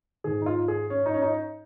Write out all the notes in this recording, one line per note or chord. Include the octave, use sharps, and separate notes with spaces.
G#2 D#3 G#4
D#4
F4
G#4
C#4
D#4
C#4
D#4